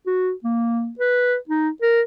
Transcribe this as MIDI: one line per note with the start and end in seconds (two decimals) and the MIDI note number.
0.06 0.32 66
0.44 0.91 58
0.99 1.36 71
1.49 1.69 63
1.82 2.01 70